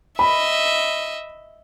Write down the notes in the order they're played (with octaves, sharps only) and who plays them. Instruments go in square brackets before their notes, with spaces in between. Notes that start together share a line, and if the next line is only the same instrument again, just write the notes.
[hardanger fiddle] D#5 E5 [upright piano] B5